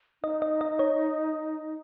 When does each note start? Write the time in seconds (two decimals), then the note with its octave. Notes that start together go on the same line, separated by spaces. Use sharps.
0.23 D#4 D#5
0.42 D#5
0.61 D#5
0.79 C#5